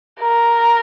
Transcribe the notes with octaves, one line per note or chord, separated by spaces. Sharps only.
A#4